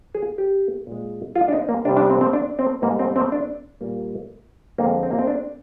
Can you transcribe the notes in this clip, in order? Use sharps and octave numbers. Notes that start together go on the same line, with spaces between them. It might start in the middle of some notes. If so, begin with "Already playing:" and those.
G#4
G4
A#2 G#3
F4
D4
D#4
A#3
C2 C3 G3 D4
D4
C4
C4
D4
C4
G#2 G3 A#3
C4
C4
D4
A#2 G3 A#3
F2 D3 G#3 A#3
C4
A#3
C4
D4